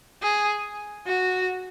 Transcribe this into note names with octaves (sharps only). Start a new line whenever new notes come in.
G#4
F#4